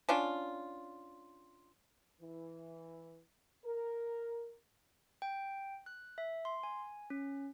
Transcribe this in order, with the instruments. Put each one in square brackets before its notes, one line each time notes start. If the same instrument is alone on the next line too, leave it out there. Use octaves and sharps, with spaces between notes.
[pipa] C#4 D4 F4
[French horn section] E3
A#4
[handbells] G5
F#6
E5
C6
G#5
C#4